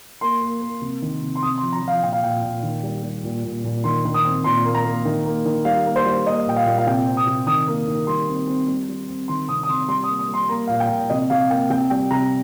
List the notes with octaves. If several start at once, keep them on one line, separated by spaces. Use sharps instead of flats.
A#3 C6
A#3
A#3
C3
D#3
C3
C6
C3 D#6
C6
F3
A#5
F3
F5
A#2 G5
F5
A#2 G5
A#2
D#3
G3
G3
A#2
A#2
A#2
D#3 C6
D#3
D#6
C4
A#2 C6
A#3
A#5
A#3
D#3
A#3
D#3
G3 F5
A#3
C5
G3
A#3 D#5
A#2 G5
F5
A#2
F5
C3 G5
C4
D#6
C3
D#3 D#6
A#3
D#3
G3 C6
C4
C4
G3
G3
C4
D#3 C6
C3 D#6
D#6
C3 C6
G3 C6
D#6
A#3
D#6
G3
C6
A#3 A#5
A#2 F5
G5
A#2
C3 D#5
C3 F5
A#3 G5
C3 G5
G3 G5
C3 A#5